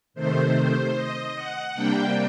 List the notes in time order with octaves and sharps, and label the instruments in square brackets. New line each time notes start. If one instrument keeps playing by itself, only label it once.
[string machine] C3 D#3 A3 C5
D#5
F#5
C3 G3 A#3 D4 G5